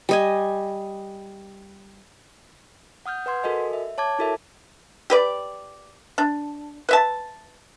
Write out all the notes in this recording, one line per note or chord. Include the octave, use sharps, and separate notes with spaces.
G3 D#5 G#5
F#5 D#6 F6 G6
B4 F#5 C6 G#6
F#4 A4 A#4 D#5 G#5
E5
C#5 A5 D6 G#6
E4 F#4 A4 A#4 E5
G4 B4 D5
D4
B4 E5 A5